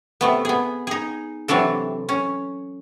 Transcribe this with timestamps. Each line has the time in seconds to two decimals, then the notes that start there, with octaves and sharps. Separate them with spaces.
0.21 C3 A3 B3
0.45 B3 G#4
0.87 D#4 G#4
1.48 C3 E3 F#3 D4 A4
2.09 C#4